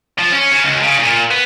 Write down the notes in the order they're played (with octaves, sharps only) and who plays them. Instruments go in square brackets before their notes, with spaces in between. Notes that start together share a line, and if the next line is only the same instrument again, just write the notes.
[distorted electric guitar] F3
C#4
C#3
C#2
C#3
A#2
B3